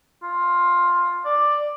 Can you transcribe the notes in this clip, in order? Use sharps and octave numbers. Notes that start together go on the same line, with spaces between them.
F4
D5